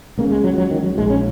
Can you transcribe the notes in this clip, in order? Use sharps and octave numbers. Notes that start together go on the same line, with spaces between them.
C#2 C#3 A#3
G#3
F#3
F#3
D#3
F#3
A#1 G#2 G#3
C#4